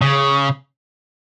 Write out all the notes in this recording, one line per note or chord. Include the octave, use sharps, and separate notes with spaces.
C#3